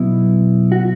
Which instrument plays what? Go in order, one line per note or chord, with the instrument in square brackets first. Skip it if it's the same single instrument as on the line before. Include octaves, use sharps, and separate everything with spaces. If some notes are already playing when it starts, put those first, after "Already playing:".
Already playing: [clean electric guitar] B2 F#3 B3 E4
F#4